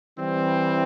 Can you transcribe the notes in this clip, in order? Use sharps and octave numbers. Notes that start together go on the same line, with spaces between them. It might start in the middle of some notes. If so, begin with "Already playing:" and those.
E3 G3 C4